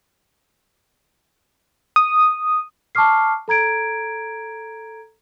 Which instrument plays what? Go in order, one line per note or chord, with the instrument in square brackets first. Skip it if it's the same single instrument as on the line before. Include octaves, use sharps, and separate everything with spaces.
[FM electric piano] D#6
[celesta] A5 C#6 D6 F6 C7
A4 A#5 G#6 D7